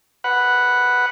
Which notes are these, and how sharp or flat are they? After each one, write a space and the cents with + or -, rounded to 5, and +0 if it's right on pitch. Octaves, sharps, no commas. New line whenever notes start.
B4 +0 F#5 +0